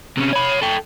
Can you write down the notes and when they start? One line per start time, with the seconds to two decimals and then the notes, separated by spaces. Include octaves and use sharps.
0.17 C3 C#4
0.33 C#5 B5
0.62 A4 G5